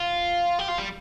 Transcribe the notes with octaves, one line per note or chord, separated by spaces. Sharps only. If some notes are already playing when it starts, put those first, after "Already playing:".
Already playing: F4
G4
F4
G3